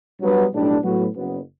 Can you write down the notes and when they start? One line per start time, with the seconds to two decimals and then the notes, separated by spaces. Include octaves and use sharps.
0.21 G2 F#3 B3
0.52 B1 A2 G3 D4
0.83 A2 F#3 B3 F#4
1.15 F#1 F#2 F#3 B3